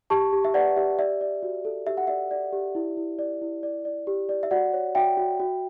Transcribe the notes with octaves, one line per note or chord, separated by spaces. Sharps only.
G4 A5 C#6
G4
E5
B4 D5 F#5
G4 E5
D5 E5
D5
F#4
A4
G4 E5
F#5
D5 E5
D5
G4
E4
E4
D5
E4
D5
D5
G4
D5
E5
F#4 D5 F#5
C#5
F#4 E5 G5
F#4
F#4